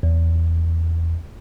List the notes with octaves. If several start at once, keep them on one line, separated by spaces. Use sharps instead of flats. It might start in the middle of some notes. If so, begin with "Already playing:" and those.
E2